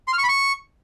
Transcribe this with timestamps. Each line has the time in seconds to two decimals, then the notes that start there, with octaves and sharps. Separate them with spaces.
0.08 C6
0.13 F6
0.18 C#6
0.23 B5
0.29 C#6